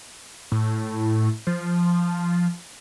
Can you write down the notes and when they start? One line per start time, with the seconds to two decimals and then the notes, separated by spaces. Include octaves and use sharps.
0.52 A2
1.47 F3